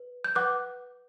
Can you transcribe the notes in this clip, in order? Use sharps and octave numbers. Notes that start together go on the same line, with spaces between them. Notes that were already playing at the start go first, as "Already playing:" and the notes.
Already playing: B4
G6
B4 F#5 D6 F#6